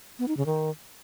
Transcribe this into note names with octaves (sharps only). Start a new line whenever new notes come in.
B3
D#4
C#3
D#3